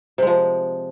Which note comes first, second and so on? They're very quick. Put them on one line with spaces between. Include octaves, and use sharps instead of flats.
C3 G#3 F3